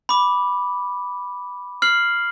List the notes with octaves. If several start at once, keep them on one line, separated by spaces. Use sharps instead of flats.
B5 D6
F6 C7 F#7